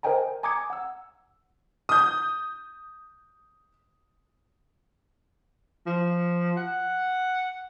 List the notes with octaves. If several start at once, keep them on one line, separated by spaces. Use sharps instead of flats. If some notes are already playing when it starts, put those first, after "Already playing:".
A#4 C5 D#5 G5 G#5 A#5
G#5 A#5 D6 D#6 G#6 C#7
F#5 E6
D#6 G6
F3
F#5